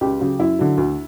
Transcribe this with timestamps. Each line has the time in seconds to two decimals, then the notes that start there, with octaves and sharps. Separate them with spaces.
0.01 C#2 G4
0.20 C#3 F#3
0.39 F#2 E4
0.59 D3 F#3
0.78 D2